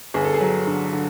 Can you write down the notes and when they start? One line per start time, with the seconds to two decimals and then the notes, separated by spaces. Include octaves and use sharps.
0.14 G1 G#4
0.24 A4
0.34 G#4
0.41 F#3
0.67 D3
0.93 D3